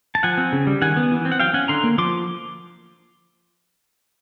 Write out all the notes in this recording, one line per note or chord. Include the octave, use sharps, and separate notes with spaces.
A5
F3 F#5 G#5
C4
C#3
G3
D#3 F#5 G#5
B3
E3
C4
F#5
F#3 F5 G5
C#4 F#5 G#5
D3 A#5 C6
A#3
F3 C6 D6